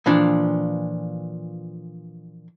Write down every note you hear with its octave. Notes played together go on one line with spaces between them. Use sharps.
A#2 E3 F3 D4